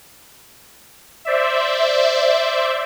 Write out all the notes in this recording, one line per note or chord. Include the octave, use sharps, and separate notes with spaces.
C5 D5 E5